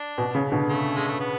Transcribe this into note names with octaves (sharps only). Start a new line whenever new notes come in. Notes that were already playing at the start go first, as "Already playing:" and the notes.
Already playing: D4
B2
C#3
B2 D3
A3
G#3
A3
B3